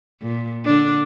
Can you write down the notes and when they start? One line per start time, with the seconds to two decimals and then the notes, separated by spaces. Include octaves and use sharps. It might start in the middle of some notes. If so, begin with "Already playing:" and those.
0.22 A#2
0.65 D3 D4